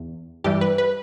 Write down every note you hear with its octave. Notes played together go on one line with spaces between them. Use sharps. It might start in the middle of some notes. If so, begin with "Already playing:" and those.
Already playing: E2
G2 E3 G3 G4
B4
B4